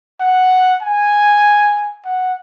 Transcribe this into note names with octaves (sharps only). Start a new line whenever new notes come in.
F#5
G#5
F#5